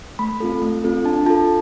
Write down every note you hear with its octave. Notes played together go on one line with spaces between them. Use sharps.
A3 B5
C4 F4 A4
A3
C4 F4 A4
D4 A5
F4 A4 A5